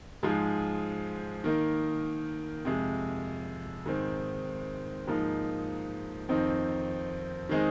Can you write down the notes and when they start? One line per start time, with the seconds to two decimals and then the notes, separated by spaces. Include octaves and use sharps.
0.23 G#2 F3 G#3
1.44 D#3 A#3 D#4
2.65 F2 C3 G#3
3.86 G#2 D#3 C4
5.07 G#2 F3 A#3 D#4
6.29 F2 D#3 C4 D#4
7.49 D#3 G#3 C4 D#4